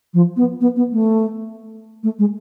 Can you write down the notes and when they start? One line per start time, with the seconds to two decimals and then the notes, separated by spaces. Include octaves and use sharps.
0.13 F3
0.36 B3
0.60 B3
0.76 B3
0.92 A3
2.03 A3
2.18 G#3